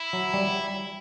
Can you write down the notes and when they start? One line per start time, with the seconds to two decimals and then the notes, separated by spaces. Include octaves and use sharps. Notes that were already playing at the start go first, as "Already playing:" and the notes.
Already playing: E4
0.13 F#3
0.34 G3